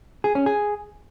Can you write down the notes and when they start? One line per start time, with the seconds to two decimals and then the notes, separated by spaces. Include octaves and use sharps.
0.24 G#4
0.35 C#4
0.46 G#4